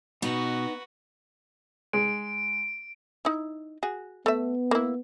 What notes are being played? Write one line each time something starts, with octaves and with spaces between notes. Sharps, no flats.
B2 B3 D#4 F#4 B4
G#3 D7
D#4 E4
F#4 G#4
A3 B3 E5
A#3 E4